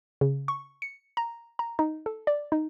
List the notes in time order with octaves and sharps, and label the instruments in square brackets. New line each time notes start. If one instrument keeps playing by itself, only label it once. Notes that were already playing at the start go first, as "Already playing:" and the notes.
[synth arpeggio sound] C#3
C#6
C#7
A#5
A#5
D#4
A4
D5
D#4